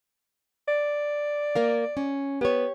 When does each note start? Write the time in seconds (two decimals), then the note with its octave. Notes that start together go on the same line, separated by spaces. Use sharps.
0.68 D5
1.55 A#3 A#4 F5
1.97 C#4
2.41 B3 G4 C#5